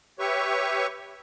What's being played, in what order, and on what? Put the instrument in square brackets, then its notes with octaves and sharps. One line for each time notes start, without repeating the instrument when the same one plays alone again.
[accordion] G4 B4 C#5 E5 C#6